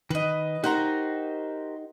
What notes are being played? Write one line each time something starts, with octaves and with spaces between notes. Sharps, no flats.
D#3 B4 D#5
D#4 F#4 G4 A#4 C5 A#5